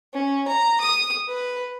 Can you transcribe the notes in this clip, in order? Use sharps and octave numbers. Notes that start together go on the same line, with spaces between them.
C#4
A#5
D#6
B4